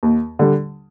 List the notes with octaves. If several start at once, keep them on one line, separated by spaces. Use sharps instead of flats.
D#2
D3 G3